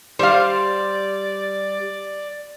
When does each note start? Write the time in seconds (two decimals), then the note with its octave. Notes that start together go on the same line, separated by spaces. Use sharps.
0.19 G3 C5 D5 F5